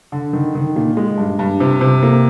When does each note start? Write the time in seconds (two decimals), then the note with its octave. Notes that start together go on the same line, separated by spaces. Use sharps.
0.12 D3
0.33 D#3
0.55 D#3
0.76 A#2
0.97 G#3
1.18 G2
1.39 G2
1.60 C3
1.81 C3
2.03 A#3